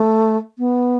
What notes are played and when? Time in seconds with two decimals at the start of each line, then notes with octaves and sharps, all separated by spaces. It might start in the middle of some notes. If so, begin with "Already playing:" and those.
Already playing: A3
0.58 B3